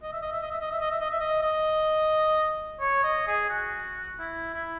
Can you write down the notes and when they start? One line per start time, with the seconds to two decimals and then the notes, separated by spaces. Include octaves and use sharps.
0.03 D#5
0.13 E5
0.22 D#5
0.32 E5
0.42 D#5
0.51 E5
0.61 D#5
0.71 E5
0.81 D#5
0.91 E5
1.00 D#5
1.10 E5
1.20 D#5
1.42 D#5
2.80 C#5
3.04 D#5
3.27 G#4
3.50 F#4
4.19 E4
4.54 E4